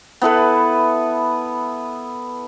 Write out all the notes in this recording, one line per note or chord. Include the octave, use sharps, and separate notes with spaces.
B3 E4 A4 B4